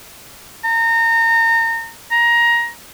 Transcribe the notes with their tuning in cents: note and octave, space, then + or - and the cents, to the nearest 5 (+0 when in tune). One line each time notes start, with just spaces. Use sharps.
A#5 -30
A#5 +15